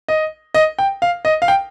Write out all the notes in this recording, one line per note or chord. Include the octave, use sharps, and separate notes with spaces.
D#5
D#5
G5
F5
D#5
F5
G5